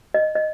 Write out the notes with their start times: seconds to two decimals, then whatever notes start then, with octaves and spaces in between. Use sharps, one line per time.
0.14 D#5
0.35 D#5